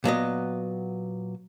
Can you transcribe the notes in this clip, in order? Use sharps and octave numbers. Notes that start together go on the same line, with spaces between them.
A#2 F#3 B3 D#5